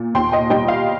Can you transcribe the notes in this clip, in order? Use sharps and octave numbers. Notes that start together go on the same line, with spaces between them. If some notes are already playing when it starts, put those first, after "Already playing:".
Already playing: A#2
D#2 G5 C6
D#5 G5
G3 D#5 G5
F5